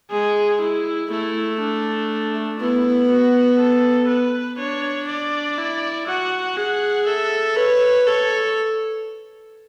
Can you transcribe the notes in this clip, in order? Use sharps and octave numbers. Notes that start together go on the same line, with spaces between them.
G#3 G#4
E4
A3 E4
D4
B3 E4
F#4
A4
B4
D4 C#5
D5
E4
F#4 F#5
G#4 F#5
A4 E5
B4 C#5
A4 C#5